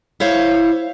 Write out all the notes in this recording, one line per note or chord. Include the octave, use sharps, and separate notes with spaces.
E4 C5 C#5 F5